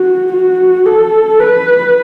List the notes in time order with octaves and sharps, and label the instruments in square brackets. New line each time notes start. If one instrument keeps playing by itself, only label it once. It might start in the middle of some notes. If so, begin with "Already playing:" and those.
Already playing: [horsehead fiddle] F#4
F#4
A4
B4